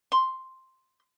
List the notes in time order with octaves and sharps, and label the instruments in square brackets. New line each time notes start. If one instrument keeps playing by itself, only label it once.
[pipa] C6